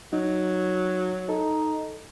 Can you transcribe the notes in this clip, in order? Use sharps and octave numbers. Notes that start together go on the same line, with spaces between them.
F#3 D#4
D#4 A4